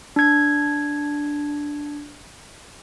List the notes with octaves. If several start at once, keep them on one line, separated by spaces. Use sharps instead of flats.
D4 G#6